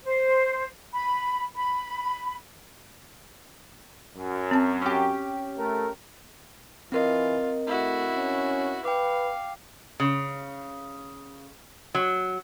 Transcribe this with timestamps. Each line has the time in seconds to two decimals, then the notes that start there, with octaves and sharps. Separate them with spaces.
0.05 C5
0.93 B5
1.55 B5
4.17 F#2
4.51 C4 A5
4.82 C#4 G4
5.57 A3 A#4
6.92 E3 C4 F4 A#4 D#5
7.67 A3 E4 F#4
8.14 C#4
8.85 B4 F5 G5 D6
10.00 C#3
11.95 F#3